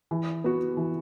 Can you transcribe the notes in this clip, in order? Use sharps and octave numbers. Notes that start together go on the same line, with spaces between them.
E3
B3 F#4
E3